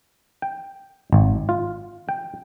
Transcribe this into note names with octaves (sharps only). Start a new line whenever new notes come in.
G5
G#1
F4
G5